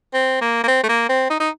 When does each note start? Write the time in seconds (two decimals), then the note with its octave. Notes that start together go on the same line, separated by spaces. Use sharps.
0.14 C4
0.41 A#3
0.63 A#3
0.67 C4
0.83 A3
0.89 A#3
1.09 C4
1.30 D#4
1.40 D#4